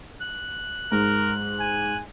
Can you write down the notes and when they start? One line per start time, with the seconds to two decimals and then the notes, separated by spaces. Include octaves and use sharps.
0.20 F#6
0.92 G#2 A#4
1.60 G#5